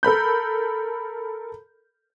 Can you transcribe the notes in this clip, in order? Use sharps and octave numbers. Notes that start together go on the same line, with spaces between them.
A4 A#4 B5 G6